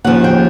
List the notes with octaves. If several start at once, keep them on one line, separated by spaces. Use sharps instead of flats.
D#2 C#3 F3 F#5
G5